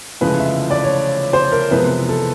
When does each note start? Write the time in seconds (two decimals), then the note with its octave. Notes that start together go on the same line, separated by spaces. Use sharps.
0.21 F1 F2 C#3 E3 G#3 B4
0.40 E5
0.71 D5
0.84 C#5
1.33 C5
1.52 A#4
1.71 F2 C3 E3 G#3 B3 B4
2.09 A4